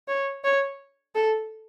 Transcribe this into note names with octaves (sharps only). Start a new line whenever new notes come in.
C#5
C#5
A4